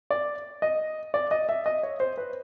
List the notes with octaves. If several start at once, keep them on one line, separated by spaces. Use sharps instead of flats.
D5
D#5
D5
D#5
E5
D#5
C#5
C5
B4